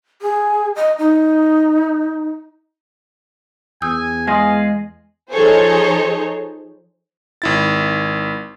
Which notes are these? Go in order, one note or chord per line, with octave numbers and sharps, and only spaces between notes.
G#4
D#5
D#4
E2 G#5 D#6 E6 G6
G#3 G#4 D#5 F5 G#5 C6 D#6
F3 D#4 G#4 A4 C5 C#5
G#1 E4 A6